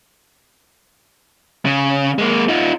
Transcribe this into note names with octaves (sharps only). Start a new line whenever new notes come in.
C#3
G#3 A#3
D#4 F4